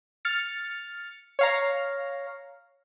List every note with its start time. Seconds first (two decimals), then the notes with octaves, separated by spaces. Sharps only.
0.25 F6 A6 C#7
1.39 C#5 F5 A#5